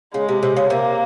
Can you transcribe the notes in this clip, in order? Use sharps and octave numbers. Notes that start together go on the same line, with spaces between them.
C#3 G#3
C3
C3
C#3
C3 A#3